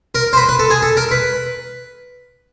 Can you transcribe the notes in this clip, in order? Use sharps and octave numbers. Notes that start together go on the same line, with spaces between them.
A#4
C5
B4
B4
A4
G#4
A4
A#4
B4